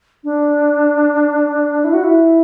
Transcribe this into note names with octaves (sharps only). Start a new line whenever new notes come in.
D4
E4
F#4
E4